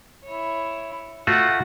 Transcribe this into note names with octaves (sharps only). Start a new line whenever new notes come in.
E4 C#5
A3 F4 F#4 F#5